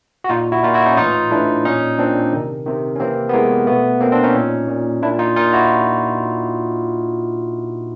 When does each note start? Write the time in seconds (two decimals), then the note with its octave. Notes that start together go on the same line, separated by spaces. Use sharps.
0.24 F#4
0.29 A#2 D#4 F4
0.52 E4 F#4
0.63 A#2 D#4 F4
0.74 E4 F#4
0.86 C#4 D#4
0.97 A2 E3 D#4 F4
1.31 A2 E3 D4 E4
1.65 A#2 C#4 D#4
1.99 A#2 C4 D4
2.33 C3 D#3
2.66 C3 D#3
2.96 C#4
3.00 C3 E3 A#3 C4
3.29 B3
3.33 C3 E3 G#3 A#3
3.67 B2 A3 B3
4.01 B2 A#3 C4
4.12 C4 D4
4.23 C#4 D#4
4.34 A#2
4.68 A#2
5.02 A#2 D4 E4
5.19 D#4 F4
5.36 A#2 D#4 F4
5.53 E4 F#4